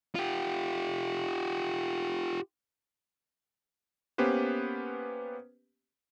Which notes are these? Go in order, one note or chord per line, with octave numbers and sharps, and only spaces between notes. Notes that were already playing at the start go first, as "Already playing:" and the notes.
F4 G4
A#3 B3 C#4 G4 B4 C5